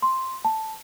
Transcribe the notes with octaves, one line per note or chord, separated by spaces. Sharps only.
C6
A5